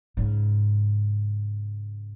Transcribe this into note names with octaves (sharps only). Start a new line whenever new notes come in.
G#2 C#3